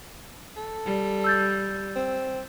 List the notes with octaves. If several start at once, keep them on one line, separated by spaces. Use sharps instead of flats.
A4
G3
E6 G6 A6
C4